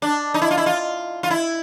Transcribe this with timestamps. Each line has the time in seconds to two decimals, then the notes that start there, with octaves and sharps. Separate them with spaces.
0.02 D4
0.34 D#4
0.42 E4
0.51 F4
0.57 E4
0.66 F4
1.23 F4
1.30 E4